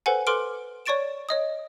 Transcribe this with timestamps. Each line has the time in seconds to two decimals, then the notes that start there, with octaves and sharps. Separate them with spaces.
0.06 A4 B4 C5 F#5 G#5
0.27 A4 B4 C6 D6 F6 D7
0.86 C#5 D5 C#6 A6 D7 E7
1.29 C#5 D#5 D#6